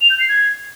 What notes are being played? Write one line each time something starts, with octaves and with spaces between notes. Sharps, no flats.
F7
G6
C7
G#6